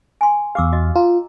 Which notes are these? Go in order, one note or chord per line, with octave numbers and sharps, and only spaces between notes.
G#5 C6
E2 G4 F5 D6 E6
F#4 D#5
F4 A#5